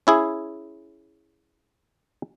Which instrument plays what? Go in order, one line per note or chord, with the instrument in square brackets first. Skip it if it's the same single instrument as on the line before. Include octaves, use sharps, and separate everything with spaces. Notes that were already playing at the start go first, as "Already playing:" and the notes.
[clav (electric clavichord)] C#4 E4 G#4